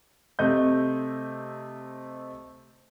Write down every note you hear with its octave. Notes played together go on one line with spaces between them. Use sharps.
C3 A3 D#5 G6